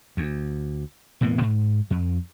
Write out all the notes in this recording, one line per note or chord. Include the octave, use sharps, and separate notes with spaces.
D2
E1 A2 A#3 B3
G#2
F2